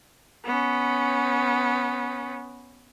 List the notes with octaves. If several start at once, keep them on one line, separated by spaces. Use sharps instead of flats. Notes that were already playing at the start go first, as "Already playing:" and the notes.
B3 C#4